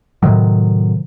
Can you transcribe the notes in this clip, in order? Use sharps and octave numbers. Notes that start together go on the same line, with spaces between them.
A2 C3 D#3 F#3